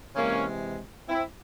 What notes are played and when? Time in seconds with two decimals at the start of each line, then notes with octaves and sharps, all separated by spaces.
0.16 C3 E3 G#3 A#3 C#4
1.08 C4 E4